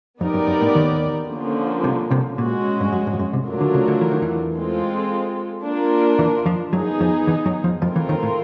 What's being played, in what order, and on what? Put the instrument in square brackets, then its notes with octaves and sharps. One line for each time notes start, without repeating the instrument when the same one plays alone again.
[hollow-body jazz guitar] F2 [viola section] B3 D#4 G4 A#4 D5
[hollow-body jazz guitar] F#2
F#2
A2
D#2 D#3
[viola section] D3 F3 A#3 C#4
[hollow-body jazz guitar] C2 C3
C2 C3
[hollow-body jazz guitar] A#2 [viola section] G#3 C#4 F#4
[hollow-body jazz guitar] G2
F#2
G2
F2
F#2
C2 C3
[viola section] F#3 A3 D4 F4 A#4
[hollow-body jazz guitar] D2 D3
C#2 C#3
D2 D3
E3
D#3
E2 E3
[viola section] G#3 C4 F4 A4
A#3 D4 F4 A#4
[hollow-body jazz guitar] E2 E3
F2 F3
[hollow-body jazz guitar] F#2 F#3 [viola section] B3 D#4 G#4
[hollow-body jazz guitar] F2 F3
E2 E3
F#2 F#3
F2 F3
[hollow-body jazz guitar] F2 F3 [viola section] A3 C4 F4 A#4
[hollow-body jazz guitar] E2 E3
D#2 D#3
A2